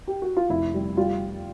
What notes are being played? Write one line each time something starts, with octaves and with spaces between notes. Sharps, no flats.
G4
F#4
F4
F1 E4
G3
G3 F4